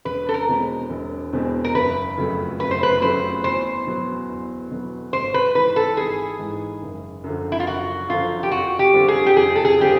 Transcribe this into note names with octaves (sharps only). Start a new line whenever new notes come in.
E1 B4
A4
A#4
E2 B2 G#3 C4
E1
E2 B2 G#3 C4
A#4
F#1 B4
F2 C#3 F#3 A3
F#1 B4
C5
B4
F2 C#3 F#3 A3 C5
E2 C5
B2 F#3 B3
E2
B2 F#3 B3
G#1 C5
B4
G#2 E3 B4
A4
G#1 G#4
G#2 E3
F#1
F#2 D3 F3
E4
F4
F#1 F#4
F#2 D3 F3 F4
G4
F2 F#4
G4
D3 G3 C4 F4
G#4
G4
F2 G#4
A4
G#4
D3 G3 C4 F4 G4